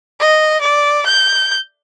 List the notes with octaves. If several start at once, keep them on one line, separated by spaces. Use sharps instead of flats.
D#5
D5
G6